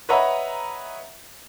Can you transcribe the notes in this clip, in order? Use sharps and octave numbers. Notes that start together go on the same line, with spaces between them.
B4 C#5 D#5 E5 F#5 A#5